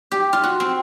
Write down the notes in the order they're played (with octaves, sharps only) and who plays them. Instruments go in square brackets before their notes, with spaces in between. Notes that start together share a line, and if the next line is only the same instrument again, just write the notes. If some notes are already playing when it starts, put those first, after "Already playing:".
[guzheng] G4
F4
F#4
C4